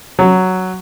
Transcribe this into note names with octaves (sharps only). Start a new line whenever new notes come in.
F#3